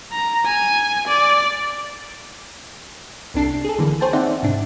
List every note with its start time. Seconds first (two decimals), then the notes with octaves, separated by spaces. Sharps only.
0.12 A#5
0.46 G#5
1.07 D5
3.34 C2 C3 D4 A4 C7
3.65 G#4 A4
3.79 D3 E3 A#3
4.01 G#4 C5 C#5 G5 A5
4.13 C4 D#4 C5 D5 E5 F#5
4.43 G#2 C3 D4